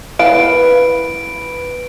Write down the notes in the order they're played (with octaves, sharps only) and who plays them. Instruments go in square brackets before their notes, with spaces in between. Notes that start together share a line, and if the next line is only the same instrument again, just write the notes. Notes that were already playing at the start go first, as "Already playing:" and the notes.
[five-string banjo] B3 E4 F5 [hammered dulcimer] B4 [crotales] D7